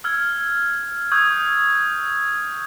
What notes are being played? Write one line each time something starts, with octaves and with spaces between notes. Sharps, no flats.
E6 F6 G#6
C#6 D#6 E6 G6 G#6